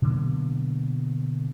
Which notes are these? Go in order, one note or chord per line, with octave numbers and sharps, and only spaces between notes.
B2 D3 F#3 A#3